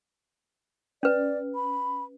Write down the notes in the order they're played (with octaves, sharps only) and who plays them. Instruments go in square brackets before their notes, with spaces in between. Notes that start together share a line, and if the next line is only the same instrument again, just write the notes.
[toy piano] C#4 B4 [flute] D5
[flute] B5